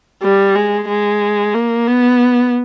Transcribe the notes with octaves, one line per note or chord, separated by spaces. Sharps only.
G3
G#3
G#3
A#3
B3